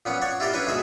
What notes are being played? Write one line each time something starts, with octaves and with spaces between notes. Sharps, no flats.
A#2 B3 C#4 F#5
C#5 D5 F#5
E4 F4 G4 A#4 D5
C#4 D4 B4 C#5
D2 B2 F#4 G#4 E5 B5